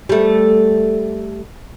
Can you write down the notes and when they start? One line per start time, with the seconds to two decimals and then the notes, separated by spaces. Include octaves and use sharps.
0.09 G3 A3